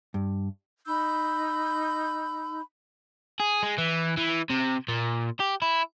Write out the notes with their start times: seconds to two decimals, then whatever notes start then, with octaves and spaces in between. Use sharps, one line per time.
0.14 G2
0.85 D#4 B5 E6 G6
3.40 G#4
3.63 G#3
3.78 E3
4.17 E3
4.50 C3
4.88 A#2
5.40 G4
5.62 E4